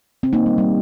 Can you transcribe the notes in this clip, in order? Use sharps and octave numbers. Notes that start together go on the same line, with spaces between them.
C4
A#3 D#4
G3
G3